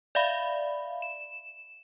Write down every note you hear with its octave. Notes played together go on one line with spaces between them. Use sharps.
D5 E5 F5 B5
E7